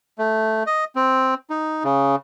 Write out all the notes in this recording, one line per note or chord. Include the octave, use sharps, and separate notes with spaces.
A3
D#5
C4
D#4
C#3